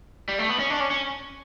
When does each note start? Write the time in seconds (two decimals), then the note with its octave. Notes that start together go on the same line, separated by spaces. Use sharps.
0.29 G3
0.39 A3
0.49 B3
0.59 C#4
0.70 D4
0.80 C#4
0.91 C#4